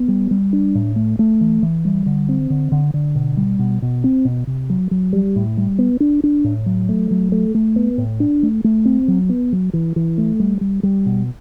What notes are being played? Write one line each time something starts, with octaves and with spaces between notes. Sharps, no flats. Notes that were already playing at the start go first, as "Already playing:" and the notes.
Already playing: B3
G3
G3
D4
A2
A3
A3
E3
E3
G3
D3
C4
D3
D3
D3
B2
G3
B2
B2
C4
B2
C3
F#3
F#3
G3
A2
G3
B3
D4
D4
A2
F#3
A3
F#3
A3
A3
B3
A2
D4
A3
A3
C4
F#3
B3
F#3
E3
E3
A3
G3
G3
G3
B2